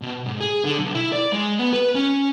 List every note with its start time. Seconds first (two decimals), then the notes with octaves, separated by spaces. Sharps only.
0.02 B2
0.26 G#2
0.40 G#4
0.65 D3
0.79 B1
0.95 E4
1.13 D5
1.33 G#3
1.59 B3
1.73 B4
1.95 C#4